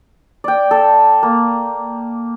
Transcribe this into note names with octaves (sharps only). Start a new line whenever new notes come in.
D5 G5
A4
A#3